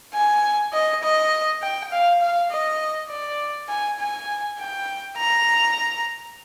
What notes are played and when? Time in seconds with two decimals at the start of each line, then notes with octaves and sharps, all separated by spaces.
0.14 G#5
0.73 D#5
1.03 D#5
1.62 G5
1.92 F5
2.21 F5
2.51 D#5
3.10 D5
3.69 G#5
3.99 G#5
4.59 G5
5.18 A#5